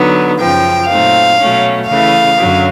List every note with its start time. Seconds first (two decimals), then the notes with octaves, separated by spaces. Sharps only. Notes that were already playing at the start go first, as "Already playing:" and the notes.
Already playing: D3 F#3 B3 D#4
0.39 F#2 C#3 F3 G5
0.89 A#2 F#3 A3 C4 D#4 F5
1.39 B2 F#3 A3 C#4
1.88 C#3 E3 A3 F5
2.38 F#2 D3 F#3